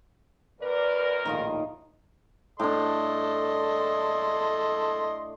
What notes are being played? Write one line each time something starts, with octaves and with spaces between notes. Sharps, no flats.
F#2 A#4 B4 D5
A#1 D#2 A2 D#3 F4 D#5
A2 D4 A4 D#5 C6